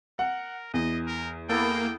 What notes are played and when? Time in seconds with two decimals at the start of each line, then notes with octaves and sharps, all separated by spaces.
0.19 A#4 F#5
0.74 E2 D#5
1.06 A#4
1.49 A#3 B3 E4 A4 G5